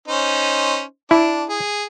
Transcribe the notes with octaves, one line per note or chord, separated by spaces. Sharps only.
C#4 D#4 C5
D4 E4
G#4